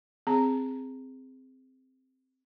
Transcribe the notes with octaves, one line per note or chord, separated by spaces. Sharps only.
C4 G#4 A#5